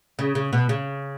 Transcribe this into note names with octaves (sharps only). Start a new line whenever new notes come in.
C#3
C#3
B2
C#3